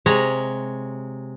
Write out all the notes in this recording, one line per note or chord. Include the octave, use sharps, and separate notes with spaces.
C3 G#3 C#5 A#5